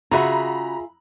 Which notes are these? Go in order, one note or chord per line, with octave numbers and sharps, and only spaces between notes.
C#3 F4 F#4 G#4 E5 F#5 A#5 B5